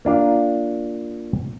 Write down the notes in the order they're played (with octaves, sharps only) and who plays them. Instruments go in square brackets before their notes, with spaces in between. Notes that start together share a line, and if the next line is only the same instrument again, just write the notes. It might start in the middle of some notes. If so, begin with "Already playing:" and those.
[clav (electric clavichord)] A#3 D4 F4